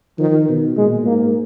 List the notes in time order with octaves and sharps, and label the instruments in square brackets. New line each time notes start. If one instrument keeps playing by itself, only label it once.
[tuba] D#3 [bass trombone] F3
[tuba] B2
[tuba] A#2 [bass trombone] G#3
[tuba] G#2 [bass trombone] A#3